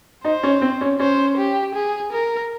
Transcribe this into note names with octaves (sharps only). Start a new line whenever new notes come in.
D#4 C5
C#4
C4
C#4
C#4 C5
G4
G#4
A#4